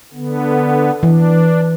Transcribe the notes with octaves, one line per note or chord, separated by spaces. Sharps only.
D3 B3
E3 D4